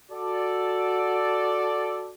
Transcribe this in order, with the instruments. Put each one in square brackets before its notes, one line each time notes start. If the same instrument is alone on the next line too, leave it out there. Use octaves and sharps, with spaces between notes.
[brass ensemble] F#4 A4 D5